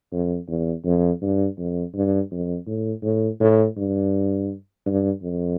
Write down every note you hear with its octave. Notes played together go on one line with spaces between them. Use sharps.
F2
E2
F2
G2
F2
G2
F2
A2
A2
A2
G2
G2
F2